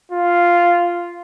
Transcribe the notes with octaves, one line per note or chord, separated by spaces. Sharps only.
F4